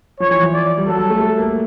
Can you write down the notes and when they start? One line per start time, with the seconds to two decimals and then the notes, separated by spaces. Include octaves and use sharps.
0.20 F3 C#5
0.31 E3
0.43 F3
0.54 D5
0.78 G3
0.87 F#3 A4
0.99 G3
1.10 A3
1.21 A3
1.38 A#3